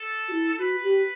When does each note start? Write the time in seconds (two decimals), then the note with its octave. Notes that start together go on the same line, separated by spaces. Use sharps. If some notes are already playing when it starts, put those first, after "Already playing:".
Already playing: A4
0.28 F#4
0.33 E4
0.58 F#4 B4
0.83 G4